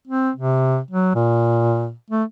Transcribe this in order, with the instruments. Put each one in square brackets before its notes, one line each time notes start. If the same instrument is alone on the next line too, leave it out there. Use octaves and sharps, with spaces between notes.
[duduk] C4
C3
F#3
A#2
A3